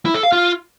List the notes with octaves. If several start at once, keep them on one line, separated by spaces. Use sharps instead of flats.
E4
A4
F5
F4